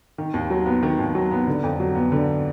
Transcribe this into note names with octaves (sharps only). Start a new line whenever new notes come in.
D#3
D#2
F#3
B3
D#3
D#2
F#3
B3
D3
F2
F#3
B3
D3